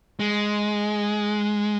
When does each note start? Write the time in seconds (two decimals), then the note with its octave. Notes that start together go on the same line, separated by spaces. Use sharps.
0.20 G#3